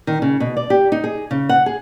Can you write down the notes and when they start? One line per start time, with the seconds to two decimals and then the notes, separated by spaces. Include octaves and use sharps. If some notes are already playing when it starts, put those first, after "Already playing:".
0.07 D#3
0.22 C#3
0.40 B2
0.57 D5
0.70 G4
0.92 D#4
1.04 G#4
1.31 C#3
1.49 F#5
1.66 G#4